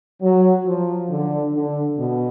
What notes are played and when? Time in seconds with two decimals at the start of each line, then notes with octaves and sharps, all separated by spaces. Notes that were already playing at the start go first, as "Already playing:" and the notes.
0.21 F#3
0.65 F3
1.09 D3
1.53 D3
1.97 B2